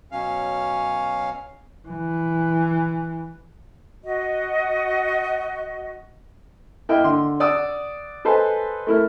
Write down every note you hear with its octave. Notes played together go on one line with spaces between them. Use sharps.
B2 F#3 C#4 F5
E3
F#4 D#5
A#3 E4 A#4 D#5 G5
D3 C6
D5 F#5 D#6 E6
A4 B4 C5 D#5 G#5 A5
A3 E4 A#4